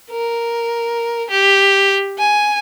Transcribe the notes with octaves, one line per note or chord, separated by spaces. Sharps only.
A#4
G4
G#5